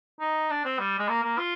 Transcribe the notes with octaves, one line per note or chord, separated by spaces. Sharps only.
D#4
D4
C4
G3
G#3
A#3
A#3
F4